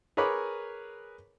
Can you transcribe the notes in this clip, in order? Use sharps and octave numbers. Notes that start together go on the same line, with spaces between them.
G#4 A#4 B4 C#5 B5 D6